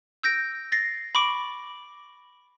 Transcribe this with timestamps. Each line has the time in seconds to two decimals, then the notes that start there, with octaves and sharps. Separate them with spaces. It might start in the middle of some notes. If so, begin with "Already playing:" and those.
0.23 E6 G6 A#6 D7
0.72 A6 A#6 C7
1.15 B5 C#6 D6 D7